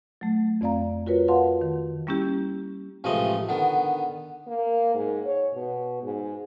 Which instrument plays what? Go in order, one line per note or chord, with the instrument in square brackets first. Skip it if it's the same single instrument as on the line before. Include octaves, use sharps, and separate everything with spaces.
[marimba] F#3 A3
F2 C4 D5 F5 A#5
F4 F#4 A#4 B4 C#5
B4 F5 F#5 A5 C6
D#3
G3 A#3 C#4 E4 G4
[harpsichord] A1 C3 F3 G#3 A3 D#5
D3 D#3 B3
[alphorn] A#3
G#2
C#5
B2
G#2